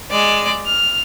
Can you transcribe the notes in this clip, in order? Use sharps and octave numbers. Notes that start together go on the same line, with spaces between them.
G#3 D5
F6